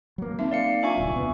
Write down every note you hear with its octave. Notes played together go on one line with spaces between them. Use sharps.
F#3 A#3
C4 D#4 E5
D5 F5 C#7
D4 F4 E5 G#5 C#6
D1 C2
E1 B3